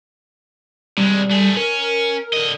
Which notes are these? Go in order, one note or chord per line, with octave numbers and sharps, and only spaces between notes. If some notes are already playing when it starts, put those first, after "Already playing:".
C3 G3 G#3
A3 G#4
C#4 A#4
D3 D#5